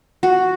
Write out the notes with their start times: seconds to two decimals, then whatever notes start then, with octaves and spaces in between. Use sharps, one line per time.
0.23 F#4